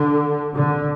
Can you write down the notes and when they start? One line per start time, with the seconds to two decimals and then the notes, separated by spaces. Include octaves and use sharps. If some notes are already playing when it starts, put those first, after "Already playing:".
Already playing: D3
0.55 D3